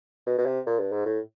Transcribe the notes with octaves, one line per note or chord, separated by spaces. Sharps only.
B2
B2
C3
A#2
G2
G#2
A2